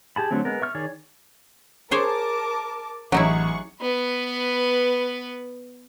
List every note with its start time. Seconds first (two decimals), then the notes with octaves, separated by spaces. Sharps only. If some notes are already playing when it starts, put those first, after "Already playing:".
0.16 G4 G#4 A5 B5
0.31 D3 F#3 A3 C4
0.45 G#3 B3 A#4
0.62 E5 C#6 F6
0.75 D#3 G#4 C#5 D5
1.91 G#4 A#4 C5 C#5 A5 D6
3.12 A1 F#3 D#4 E4 G#4 F#5 C#6
3.81 B3 B4